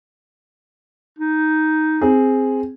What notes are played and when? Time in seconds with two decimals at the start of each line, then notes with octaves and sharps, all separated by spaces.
1.19 D#4
2.01 C4 G#4